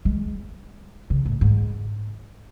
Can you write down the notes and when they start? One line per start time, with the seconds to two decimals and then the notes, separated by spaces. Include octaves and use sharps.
0.05 G#3
1.10 C#3
1.26 A2
1.41 G#2